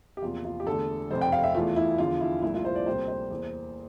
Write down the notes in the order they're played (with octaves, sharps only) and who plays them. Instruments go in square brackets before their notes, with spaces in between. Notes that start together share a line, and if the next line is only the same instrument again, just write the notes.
[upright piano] G4
E2 C3 F3 A#3 F4
F4
G4
E2 D3 A3 A4
F1 F2 C3 C5
G5
F5
E5
E2 E3 A3 F4
E4
E2 D3 F3 F4
E4
C2 A#2 F3 A3 E4
F4
C5
D5
D2 C3 G3 A#3 C5
C5
E2 E3 A#3